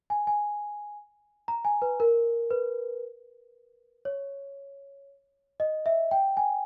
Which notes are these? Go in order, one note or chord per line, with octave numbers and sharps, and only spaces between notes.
G#5
G#5
A#5
G#5
B4
A#4
B4
C#5
D#5
E5
G5
G#5